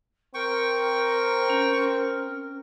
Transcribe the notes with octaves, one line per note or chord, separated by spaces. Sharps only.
C4 A#4 G5 C#6
C#4